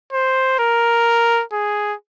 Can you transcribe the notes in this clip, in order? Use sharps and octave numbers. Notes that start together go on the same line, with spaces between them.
C5
A#4
G#4